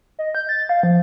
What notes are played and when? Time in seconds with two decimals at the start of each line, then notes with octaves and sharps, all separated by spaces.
0.19 D#5
0.35 G6
0.49 A6
0.69 F5
0.83 F3